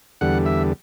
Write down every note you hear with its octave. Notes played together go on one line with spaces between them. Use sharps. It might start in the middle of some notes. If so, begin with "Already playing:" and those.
E2 D3 G3 F#5
E5